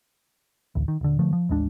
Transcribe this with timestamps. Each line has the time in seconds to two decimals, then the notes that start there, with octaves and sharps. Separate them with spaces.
0.75 A1 D2
0.88 D#3
1.01 D#1 D3
1.19 D3 F3 A3
1.33 F3
1.49 A1 D#2 G#3 D4